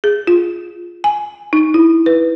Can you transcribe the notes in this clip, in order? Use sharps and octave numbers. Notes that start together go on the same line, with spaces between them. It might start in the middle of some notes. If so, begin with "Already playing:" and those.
G#4
F4
G#5
D#4
E4
B4